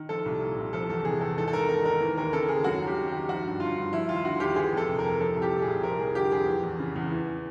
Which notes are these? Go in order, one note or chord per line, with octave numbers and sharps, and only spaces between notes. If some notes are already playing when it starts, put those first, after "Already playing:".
Already playing: D#3
F3 A4
C2
A#2
C2
F3 A4
E2 A4
C3 G#4
E2 A4
G#2 A4
A4
G#2 A#4
D#3 A#4
D#3 A#4
E3
D#2 A#4
C#3 A4
D#2 G#4
F#2 F#4
F#2
G4
D#3
D#3 G4
F3 F#4
G2
D3 F4
G2
F3 E4
D#2 F4
D3 F#4
D#2 G4
E3 G#4
F2 A4
C3
A#4
F2
F3 A4
C2
G4
A#2
G#4
C2
F3 A#4
F2 G#4
D3 G4
F2 G#4
E3
E2
C#3
E2
E3